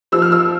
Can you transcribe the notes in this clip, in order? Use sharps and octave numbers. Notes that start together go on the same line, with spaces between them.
F3 E6
F6
E6